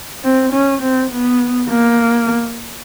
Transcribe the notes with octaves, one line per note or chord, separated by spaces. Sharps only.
C4
C#4
C4
B3
A#3